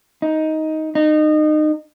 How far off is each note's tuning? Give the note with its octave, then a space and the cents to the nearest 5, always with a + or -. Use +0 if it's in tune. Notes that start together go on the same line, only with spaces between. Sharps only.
D#4 +10
D#4 -25